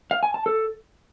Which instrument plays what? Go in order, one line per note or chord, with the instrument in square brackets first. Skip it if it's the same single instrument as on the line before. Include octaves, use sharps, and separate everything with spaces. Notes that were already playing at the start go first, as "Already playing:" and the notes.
[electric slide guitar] F5
G#5
A5
A4